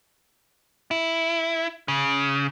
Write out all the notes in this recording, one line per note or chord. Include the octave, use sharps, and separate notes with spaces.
E4
C#3